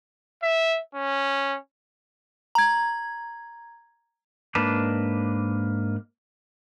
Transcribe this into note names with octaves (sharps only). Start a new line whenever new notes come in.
E5
C#4
A#5 G#6
G#2 A#3 D4 B4 A5